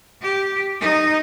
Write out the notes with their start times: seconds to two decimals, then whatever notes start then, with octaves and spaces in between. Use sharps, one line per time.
0.21 G4
0.81 D#4